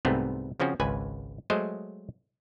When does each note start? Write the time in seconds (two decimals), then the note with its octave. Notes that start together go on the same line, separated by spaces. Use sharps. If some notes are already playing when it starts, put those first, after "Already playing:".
0.05 C2 G#2 C3 A3 B3 C4
0.60 C#3 F3 C4 C#4 F#4
0.80 G#1 C#2 B4 G#5
1.50 F#3 G#3 A3 C5 D#5